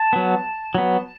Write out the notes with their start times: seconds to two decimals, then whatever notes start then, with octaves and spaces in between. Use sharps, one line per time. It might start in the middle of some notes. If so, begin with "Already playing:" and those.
Already playing: A5
0.13 F#3 B3
0.75 F#3 B3